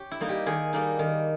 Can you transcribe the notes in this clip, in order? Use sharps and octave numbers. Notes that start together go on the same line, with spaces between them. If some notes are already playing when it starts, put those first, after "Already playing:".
Already playing: G4 C#5
E4
G3 A#3 D#4
G4
D#3 G#4
G3 A#3 D#4
D#3